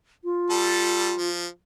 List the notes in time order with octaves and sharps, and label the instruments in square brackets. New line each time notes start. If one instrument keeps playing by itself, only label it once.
[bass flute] F4
[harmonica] G3 A4
F3